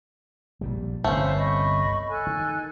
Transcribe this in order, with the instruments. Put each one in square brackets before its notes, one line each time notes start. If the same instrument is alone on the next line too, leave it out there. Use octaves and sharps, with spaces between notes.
[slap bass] A#1 A#2 G3
[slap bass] G1 C2 [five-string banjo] A3 C#4 [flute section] B4 C5 F5
[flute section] D#5 B5 C#6
A4 G#5 F#6
[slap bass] D#3